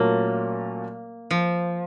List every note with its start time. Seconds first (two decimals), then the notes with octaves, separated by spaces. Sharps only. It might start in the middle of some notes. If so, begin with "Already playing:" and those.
Already playing: A#2 F#3 A3 A#3 C#4
1.31 F3